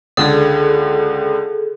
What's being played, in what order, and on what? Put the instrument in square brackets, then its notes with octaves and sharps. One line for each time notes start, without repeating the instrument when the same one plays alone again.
[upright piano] C#2 D3 [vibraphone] G#4 A4